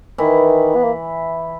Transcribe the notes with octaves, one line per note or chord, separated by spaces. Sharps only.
D#3 E3 E4
B3
A#3